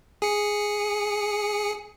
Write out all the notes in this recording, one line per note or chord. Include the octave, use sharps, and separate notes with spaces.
G#4 C#7